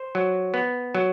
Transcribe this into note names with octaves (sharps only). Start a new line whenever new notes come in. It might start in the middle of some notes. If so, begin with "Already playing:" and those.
Already playing: C5
F#3
B3
F#3